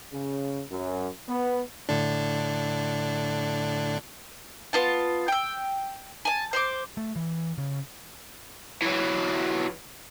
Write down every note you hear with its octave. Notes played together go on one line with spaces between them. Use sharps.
C#3
F#2
B3
A2 D3 D4
B3 F4 A5
G5 E6
G#5 A5
C5 C6 D6
A3
E3
C#3
E3 F#3